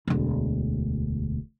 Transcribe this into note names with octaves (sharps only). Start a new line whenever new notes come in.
E1 D2